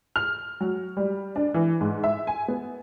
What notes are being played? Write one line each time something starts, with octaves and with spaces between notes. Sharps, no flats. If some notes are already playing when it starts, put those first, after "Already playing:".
F6
F#3
G3
D4
E3
G#2
E5
G#5
B3